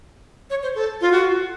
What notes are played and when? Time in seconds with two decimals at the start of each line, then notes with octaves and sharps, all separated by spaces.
0.50 C#5
0.63 C5
0.75 A4
1.01 F4
1.12 F#4